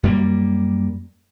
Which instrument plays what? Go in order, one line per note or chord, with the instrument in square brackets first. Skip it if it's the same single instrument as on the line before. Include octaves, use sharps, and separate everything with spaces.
[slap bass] F#2 G3 A#3